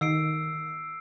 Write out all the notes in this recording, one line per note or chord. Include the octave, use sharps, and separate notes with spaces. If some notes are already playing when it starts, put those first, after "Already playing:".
D#3 E6 C7 D7